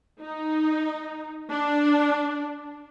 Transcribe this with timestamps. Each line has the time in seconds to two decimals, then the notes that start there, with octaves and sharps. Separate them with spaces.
0.21 D#4
1.51 D4